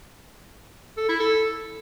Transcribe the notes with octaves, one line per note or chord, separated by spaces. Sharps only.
A4
E4
A4